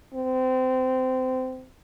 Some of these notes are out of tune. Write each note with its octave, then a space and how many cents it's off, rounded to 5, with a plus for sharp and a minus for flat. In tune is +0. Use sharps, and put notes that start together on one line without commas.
C4 -25